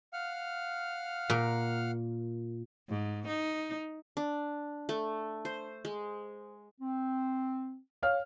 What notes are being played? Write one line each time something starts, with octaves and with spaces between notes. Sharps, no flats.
F5 F#5 F6
A#2 A#4
G#2
D#4
D4
A3
C5
G#3
C4
C#5 F5 F6